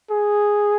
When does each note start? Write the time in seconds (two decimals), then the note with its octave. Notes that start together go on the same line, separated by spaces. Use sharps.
0.11 G#4